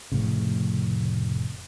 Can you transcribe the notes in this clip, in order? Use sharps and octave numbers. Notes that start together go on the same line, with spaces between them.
F1 A2 C#3